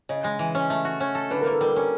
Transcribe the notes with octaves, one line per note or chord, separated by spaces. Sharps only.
C#3 D#5
G#3
E3
C#4
A3
F#4
C#4
A4
D3 B4
A#3 A#4
A4
G3 A#4
C#4